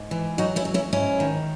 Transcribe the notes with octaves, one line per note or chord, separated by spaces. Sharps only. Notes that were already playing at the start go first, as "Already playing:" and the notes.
Already playing: G#2
E3
F#3 D#4 F#4
C#4 E4
F#3
C#4 E4
G#2 C#4 E4
D#3